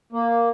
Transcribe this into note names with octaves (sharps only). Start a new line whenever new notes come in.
A#3